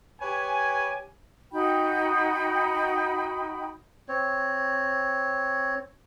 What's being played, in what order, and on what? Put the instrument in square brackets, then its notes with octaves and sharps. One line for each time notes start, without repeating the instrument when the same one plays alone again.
[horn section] G4 B4 C#5 G#5
[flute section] D#4 F#4 G5 B5
[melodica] C4 C#5